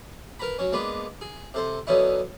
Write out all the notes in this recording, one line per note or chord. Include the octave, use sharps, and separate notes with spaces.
A#4 B4 A#5 B5
F#3 C#4
G#3 A#3 B3 D4 B4
G#4
C3 A4 C5
D3 F#3 B3 C#4 D#4 E4